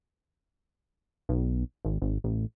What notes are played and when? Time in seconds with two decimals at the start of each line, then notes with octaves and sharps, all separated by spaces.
1.29 B1
1.85 G#1
2.02 G#1
2.24 A1